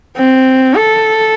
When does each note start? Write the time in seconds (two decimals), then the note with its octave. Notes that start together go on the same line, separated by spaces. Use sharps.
0.17 C4
0.76 A4